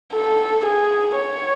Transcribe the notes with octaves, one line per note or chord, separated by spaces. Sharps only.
A4
G#4
C#5